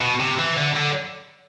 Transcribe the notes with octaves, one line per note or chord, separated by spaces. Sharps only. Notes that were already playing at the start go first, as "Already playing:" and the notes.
B2
C3
E3
D3
D3